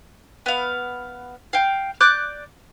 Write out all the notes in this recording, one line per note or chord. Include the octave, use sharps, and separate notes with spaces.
B3 F5
F5 G5
D5 D6 F#6 G6